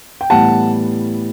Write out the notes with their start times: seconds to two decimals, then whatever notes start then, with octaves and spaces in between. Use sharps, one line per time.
0.21 G5
0.30 A2 E3 G3 B3 F#5 A5